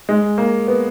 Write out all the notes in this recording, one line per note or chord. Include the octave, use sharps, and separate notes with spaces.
G#3
A#3
B3